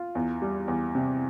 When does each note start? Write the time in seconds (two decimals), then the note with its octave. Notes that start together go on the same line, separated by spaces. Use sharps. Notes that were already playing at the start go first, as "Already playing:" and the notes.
Already playing: F4
0.15 E2
0.42 G3
0.68 E2
0.95 C3